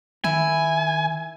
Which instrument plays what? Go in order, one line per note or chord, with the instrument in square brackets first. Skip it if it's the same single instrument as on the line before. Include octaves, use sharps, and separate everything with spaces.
[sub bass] D#3 [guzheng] E4 [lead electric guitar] G#5